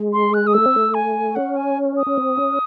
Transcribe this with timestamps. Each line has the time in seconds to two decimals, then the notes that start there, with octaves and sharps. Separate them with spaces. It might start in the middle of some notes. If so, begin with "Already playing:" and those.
Already playing: G#3
0.13 C6
0.34 F#6
0.47 D#6
0.53 A3 E6
0.66 C4
0.76 A3
0.94 G#5
1.35 C#4 F#5
1.56 G#5
1.97 D#6
2.07 C#4
2.17 C4
2.37 C#4